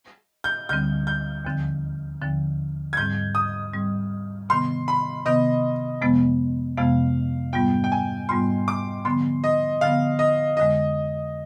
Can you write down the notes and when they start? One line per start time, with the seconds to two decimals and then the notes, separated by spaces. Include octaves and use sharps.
0.44 G6
0.69 D2 D3 G3 C4 G6
1.07 G6
1.45 D#2 D3 F3 C4
2.22 D#2 D3 F3 C4
2.93 G#6
2.97 G#2 G3 C4 G6
3.35 D#6
3.73 G#2 G3 C4
4.49 C3 D#3 B3 C6
4.88 B5
5.25 C3 D#3 B3 D#5
6.01 F2 C3 F3 G#3 B3
6.77 F2 C3 F3 G#3 B3 F5
7.53 G#2 G3 B3 F4 G5
7.84 G5
7.92 G#5
8.29 G#2 G3 B3 F4 C6
8.68 D6
9.05 D3 F3 B3 C6
9.44 D#5
9.81 D3 F3 B3 F5
10.19 D#5
10.57 F2 D3 G#3 D#5